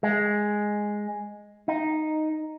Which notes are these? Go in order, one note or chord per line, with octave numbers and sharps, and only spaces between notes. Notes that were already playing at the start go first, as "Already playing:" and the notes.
G#3
D#4